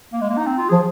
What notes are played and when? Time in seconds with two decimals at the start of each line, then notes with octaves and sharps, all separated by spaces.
0.13 A#3
0.21 G#3
0.30 A#3
0.37 D#4
0.46 C4
0.58 F4
0.69 G#4
0.72 F3